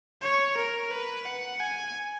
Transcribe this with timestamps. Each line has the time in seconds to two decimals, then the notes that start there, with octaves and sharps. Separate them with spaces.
0.22 C#5
0.57 A#4
0.91 B4
1.25 F#5
1.60 G#5